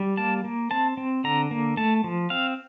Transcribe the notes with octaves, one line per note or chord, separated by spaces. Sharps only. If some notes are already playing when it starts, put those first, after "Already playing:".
Already playing: G3
A#3 A5
A#3
C4 A5
C4
D3 A#5
A#3
A3 A5
F3
C4 F5